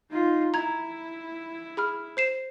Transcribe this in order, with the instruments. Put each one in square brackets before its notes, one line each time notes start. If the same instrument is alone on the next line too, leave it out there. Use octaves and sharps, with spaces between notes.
[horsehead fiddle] D#4 F4
[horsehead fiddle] E4 [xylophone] A#5 G#6
[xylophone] G#4 B5 F6
C5 C7 E7